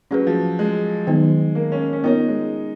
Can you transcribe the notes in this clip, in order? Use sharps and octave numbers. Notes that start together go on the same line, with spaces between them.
F#3 C#4 G#4 B4
F3
G#3
D#3 F#3 B3 D#4
A#3
C#4
C#4
B3 D#4 F4 A#4 C#5
G#3